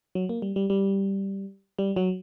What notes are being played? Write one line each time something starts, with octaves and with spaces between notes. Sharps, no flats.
F#3
A#3
G3
G3
G3
G3
F#3